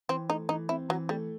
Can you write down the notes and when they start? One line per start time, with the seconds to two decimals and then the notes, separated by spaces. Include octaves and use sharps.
0.09 E3 C4
0.29 A3 D#4
0.49 E3 D#4
0.69 C4 E4
0.89 E3 F#3
1.09 G3 A3